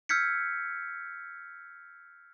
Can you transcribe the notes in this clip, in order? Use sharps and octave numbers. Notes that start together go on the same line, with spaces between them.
E6 F6 G6 G#6 B6 C#7